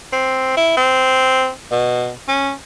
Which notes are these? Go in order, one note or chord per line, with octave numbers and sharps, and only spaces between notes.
C4
E4
C4
B2
C#4